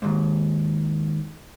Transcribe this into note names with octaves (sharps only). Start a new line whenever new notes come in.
D#2 G#2